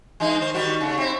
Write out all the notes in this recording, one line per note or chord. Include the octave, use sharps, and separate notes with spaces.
E3 G#3 D#4
D#3 C5
D#3 G3 F#4
C#3 A3
C4 E4